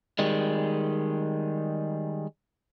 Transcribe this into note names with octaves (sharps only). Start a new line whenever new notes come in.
D#3 G3 G#3